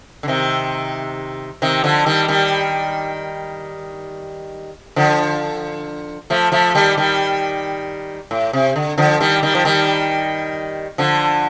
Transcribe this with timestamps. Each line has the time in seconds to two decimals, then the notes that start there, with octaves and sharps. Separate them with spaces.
0.23 D3
0.28 C3 D#3
1.62 C3 D#3
1.84 D3 F3
2.06 D#3 G3
2.28 D#3 G3
4.96 D3 F3
6.30 F3 A3
6.52 F3 A3
6.75 D#3 G3
6.97 D#3 G3
8.31 A2
8.53 C3
8.76 D3
8.98 D3 F3
9.20 D#3 G3
9.43 D#3 G3
9.55 F3
9.65 D#3 G3
10.98 D3 F3